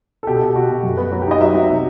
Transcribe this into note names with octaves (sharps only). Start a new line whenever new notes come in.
A4
B2 G4
A4
B2
B2 F#4
B2
F#2
B3
F#3 F#4
G4
D#4 D#5
F#3 E5
F#3
C3